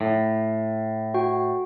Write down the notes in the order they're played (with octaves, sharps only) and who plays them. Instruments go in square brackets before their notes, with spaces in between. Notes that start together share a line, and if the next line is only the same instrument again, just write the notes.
[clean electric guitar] A2
[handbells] F#4 G5